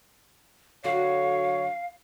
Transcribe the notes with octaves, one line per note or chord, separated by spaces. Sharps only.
D3 F#3 F#4 C#5 F5